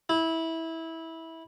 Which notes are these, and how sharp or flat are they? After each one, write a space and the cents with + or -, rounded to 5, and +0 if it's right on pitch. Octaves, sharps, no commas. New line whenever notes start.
E4 -15